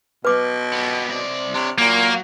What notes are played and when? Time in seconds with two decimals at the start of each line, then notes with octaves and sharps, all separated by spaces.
0.25 B2 B4 D6
0.72 B3 G4
1.09 C3 D5
1.54 C3 D4 C#5
1.78 A#2 F#3 A#3